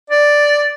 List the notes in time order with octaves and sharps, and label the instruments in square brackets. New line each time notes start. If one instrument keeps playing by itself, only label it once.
[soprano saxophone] D5